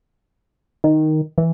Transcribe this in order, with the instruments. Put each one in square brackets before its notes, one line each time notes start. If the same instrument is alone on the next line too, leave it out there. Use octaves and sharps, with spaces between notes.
[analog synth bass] D#3
E3